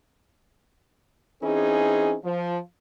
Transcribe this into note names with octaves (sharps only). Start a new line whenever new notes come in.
E3 C4 C#4 D#4 G#4
F3